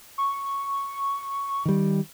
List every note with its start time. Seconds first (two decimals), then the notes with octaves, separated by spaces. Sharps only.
0.18 C#6
1.65 D#3 G3